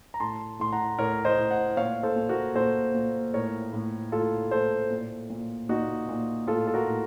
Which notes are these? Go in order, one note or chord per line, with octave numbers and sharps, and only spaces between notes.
A#5
A2 A5 C6
A2 C6
F#5 A#5
A2 A#4 C#5
C5 D#5
A2
D#5 F#5
A#2 C#5 F5
A4 C5
A#2
F#4 A#4
A#2 A4 C5
A#2
A2 A#4 C#5
A2
A2 F4 A4
A2 A4 C5
A#2
A#2
A#2 D#4 F#4
A#2
A2 F4 A4
A4
F#4 A#4
A2